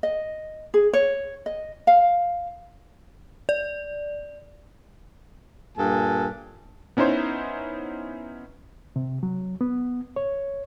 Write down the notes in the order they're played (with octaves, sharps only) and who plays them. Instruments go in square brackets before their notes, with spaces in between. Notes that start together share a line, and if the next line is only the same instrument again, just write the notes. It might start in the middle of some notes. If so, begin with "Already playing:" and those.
[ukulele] D#5
G#4
C#5
D#5
F5
[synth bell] D5
[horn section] G2 A#2 A4 G#5
[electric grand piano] B3 C#4 D#4 E4 C5 C#5
[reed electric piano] C3
F#3
B3
C#5